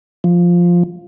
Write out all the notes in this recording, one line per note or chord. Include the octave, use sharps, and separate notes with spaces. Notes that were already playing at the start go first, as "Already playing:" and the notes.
F3